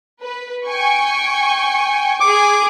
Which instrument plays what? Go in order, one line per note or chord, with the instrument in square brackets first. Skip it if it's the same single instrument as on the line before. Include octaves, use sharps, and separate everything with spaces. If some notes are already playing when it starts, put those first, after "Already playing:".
[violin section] B4
G5 G#5 C#6
[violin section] G#4 G#5 [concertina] D6